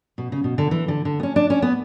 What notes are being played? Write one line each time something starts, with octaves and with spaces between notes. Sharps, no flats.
B2
C#3
B2
D3
E3
D3
D3
B3
C#4
D4
C#4
B3